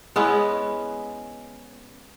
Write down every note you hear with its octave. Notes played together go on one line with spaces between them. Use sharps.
G#3 B3 C#4 E4